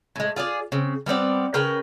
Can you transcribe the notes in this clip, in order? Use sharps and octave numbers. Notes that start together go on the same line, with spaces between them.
A2 G#3
F4 G#4 C#5 D5
C#3 C4
G3 B3 C4 D5
C#3 A#4 B4 G5